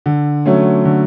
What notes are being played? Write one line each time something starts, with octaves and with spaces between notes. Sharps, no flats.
D3
F#3 A3 C#4
D3